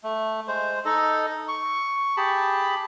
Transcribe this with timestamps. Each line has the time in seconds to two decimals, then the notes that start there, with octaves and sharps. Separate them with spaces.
0.04 A3
0.48 G#3 C5
0.85 D#4 A4 D#5
1.48 C#6
2.17 G4 G#4 A5 B5